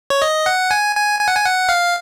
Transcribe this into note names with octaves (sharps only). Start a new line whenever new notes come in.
C#5
D#5
F#5
G#5
G#5
G#5
F#5
G#5
F#5
F5